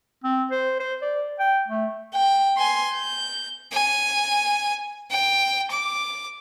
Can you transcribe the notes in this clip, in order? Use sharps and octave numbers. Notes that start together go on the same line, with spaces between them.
C4
C5
C5
D5
G5
A3
G5
G#5 C6
G6
G#5
G5
D6